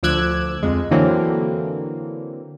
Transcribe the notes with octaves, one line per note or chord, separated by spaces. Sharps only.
D2 F3 D6 E6 F#6 G#6
F2 G#3
D3 E3 F#3 A#3 C4